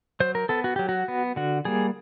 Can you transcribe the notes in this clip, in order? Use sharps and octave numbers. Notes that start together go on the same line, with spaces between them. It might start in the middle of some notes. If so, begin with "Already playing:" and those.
F#3 C5
A#4
B3 A4
F#4
F#3 G4
F#4
B3
D3 F#4
G3 A#3 G#4